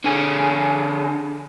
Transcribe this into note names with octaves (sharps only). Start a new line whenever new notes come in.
D3 G#4